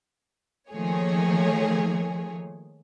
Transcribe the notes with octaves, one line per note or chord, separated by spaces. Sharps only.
D#3 F3 A3 A#3 G#4 C#5